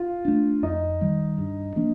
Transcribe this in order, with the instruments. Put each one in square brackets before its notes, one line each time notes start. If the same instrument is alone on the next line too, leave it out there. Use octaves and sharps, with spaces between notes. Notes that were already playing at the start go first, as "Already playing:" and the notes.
Already playing: [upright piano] F4
[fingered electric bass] A3 D4
[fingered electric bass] F2 [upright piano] D#4
[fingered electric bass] D#3 G3
G2
F3 A#3 D4